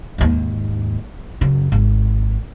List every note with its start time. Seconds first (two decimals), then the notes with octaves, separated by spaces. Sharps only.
0.18 D#2 G#2
1.41 F#2 C#3
1.72 G#1